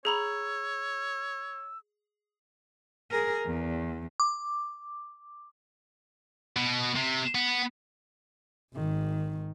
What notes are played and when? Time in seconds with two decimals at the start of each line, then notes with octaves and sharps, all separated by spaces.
0.05 G#4 C#5 A#5 B5 E6
3.11 G#4 A#4
3.46 E2
4.20 D6
6.56 B2
6.96 C3
7.35 B3
8.74 G#1 D#3